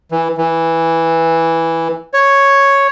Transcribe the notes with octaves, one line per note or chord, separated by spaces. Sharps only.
E3
E3
C#5